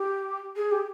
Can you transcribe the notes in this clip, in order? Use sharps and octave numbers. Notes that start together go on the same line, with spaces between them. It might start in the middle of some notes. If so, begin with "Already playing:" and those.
Already playing: G4
G#4
G4